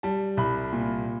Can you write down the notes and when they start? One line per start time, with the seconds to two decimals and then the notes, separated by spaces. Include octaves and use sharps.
0.03 G3 A5
0.37 C2 B5
0.72 A#2